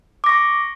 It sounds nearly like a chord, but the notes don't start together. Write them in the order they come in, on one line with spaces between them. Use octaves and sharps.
D6 A#6 C#6